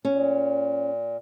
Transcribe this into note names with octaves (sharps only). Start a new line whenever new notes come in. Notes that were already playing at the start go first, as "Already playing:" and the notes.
A#2 C#4